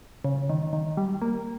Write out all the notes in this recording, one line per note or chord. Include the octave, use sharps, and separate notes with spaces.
C#3
D#3
D#3
G3
A#3